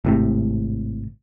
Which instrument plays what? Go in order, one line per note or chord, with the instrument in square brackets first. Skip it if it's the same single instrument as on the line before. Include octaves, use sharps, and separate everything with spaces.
[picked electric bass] G#1 A2 C3